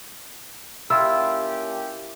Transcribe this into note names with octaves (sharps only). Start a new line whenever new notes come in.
A#3 C#4 E4 F4 G4 E6